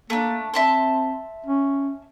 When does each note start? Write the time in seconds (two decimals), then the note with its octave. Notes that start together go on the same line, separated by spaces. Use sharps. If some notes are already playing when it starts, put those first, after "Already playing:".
0.10 A3 A#3 D4
0.54 C4 E5 A5 C6
1.46 C#4